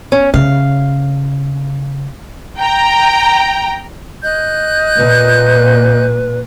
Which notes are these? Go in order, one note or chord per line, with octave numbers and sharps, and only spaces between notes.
C#4
C#3 F5
G5 A#5
D#5 F#6 G6
A#2 B4